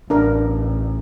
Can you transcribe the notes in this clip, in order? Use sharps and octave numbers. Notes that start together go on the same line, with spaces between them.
A1 D4 A#4